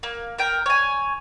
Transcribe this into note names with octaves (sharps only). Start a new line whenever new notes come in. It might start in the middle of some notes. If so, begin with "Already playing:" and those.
A#3
A#4 G5
C#5 G#5